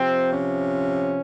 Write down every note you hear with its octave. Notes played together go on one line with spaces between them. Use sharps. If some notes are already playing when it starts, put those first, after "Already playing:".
Already playing: C3 F3 C4
C#4